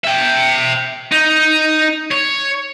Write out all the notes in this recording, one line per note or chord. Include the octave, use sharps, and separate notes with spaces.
E5 G5
D#4
C#5